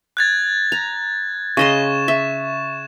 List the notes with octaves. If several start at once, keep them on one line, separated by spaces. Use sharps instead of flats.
F#6 G#6 A6
A#5
C#3 D#5 C6 C#6 E7
E5